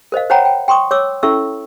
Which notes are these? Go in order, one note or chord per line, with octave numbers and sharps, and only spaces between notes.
A#4 C5 D#5 F5
C5 C#5 F#5 G5 A#5 B5
G5
G5 C6 C#6 D#6
C#5 D6 E6
C#4 E4 A4 E5 C#6 E6